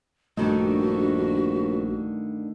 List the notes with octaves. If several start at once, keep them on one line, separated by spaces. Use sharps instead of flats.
A#1 G2 D3 D#3 A3 F#4